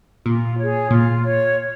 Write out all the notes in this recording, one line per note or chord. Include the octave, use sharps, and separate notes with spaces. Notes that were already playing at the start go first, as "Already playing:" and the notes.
A#2 F4
G#4 C#5
A#2 F4
C#5